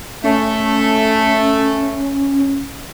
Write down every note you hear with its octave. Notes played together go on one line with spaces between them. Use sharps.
A3 C#4